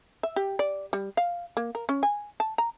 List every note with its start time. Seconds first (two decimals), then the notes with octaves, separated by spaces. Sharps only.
0.23 E5
0.36 G4
0.59 D5
0.93 G3
1.17 F5
1.57 A#3
1.75 A#4
1.89 C#4
2.03 G#5
2.40 A5
2.58 A#5